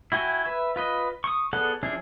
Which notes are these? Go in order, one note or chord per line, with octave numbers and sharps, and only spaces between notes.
E4 F#4 G5 G#5
B4 E5
F4 B4 D#5
C#6 D#6
B3 G#4 A4 D5 F#5
F3 C#4 D4 E4 G#4